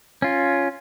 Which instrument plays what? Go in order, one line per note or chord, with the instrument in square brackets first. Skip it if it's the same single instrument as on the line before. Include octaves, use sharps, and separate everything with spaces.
[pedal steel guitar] C#4 F4